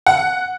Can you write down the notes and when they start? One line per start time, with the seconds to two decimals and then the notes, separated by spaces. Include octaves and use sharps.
0.06 F#5